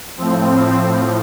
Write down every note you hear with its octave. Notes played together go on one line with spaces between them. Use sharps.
A2 F3 C4
A2 F3